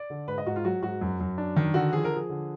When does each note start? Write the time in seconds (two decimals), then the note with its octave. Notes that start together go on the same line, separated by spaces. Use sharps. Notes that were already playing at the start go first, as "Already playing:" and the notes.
Already playing: D5
0.10 D3
0.28 G#2 B4
0.38 D#5
0.46 G#2 F#4
0.56 F4
0.65 F#3 F#4
0.82 G#2 F#4
1.01 F#2
1.20 F#2
1.38 D4
1.56 D#3
1.74 D3 F#4
1.92 F3 G#4
2.04 A#4
2.11 F3 G#4
2.30 D3